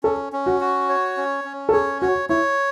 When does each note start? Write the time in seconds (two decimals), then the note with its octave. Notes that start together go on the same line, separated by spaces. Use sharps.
0.03 C#4 A4
0.33 C#4
0.46 F#4
0.61 F#4
0.89 C#5
1.17 C#4
1.44 C#4
1.69 A4
1.73 G#4 C#5
2.02 F#4 C#5
2.29 E4 C#5